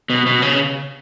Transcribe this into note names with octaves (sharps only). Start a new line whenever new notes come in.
B2
B2
C#3